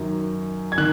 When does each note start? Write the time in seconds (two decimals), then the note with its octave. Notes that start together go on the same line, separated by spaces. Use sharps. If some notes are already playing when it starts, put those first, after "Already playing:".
Already playing: F#2 D#3
0.72 G#6
0.78 D#3 F#6